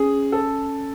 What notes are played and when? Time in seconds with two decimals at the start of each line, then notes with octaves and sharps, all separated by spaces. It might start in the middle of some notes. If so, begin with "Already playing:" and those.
Already playing: C#4 G#4
0.32 A4